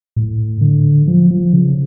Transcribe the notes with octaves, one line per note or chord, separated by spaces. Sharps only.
A2
D3
F3
F3
C#3